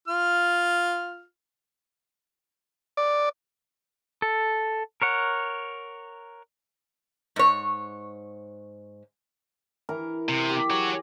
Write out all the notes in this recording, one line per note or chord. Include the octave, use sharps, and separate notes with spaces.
F4 F6
D5
A4
A#4 C#5 F#5
G#2 C#5
E3 A#4 A#5
C3
G4
F#4 G#4 C#5
D6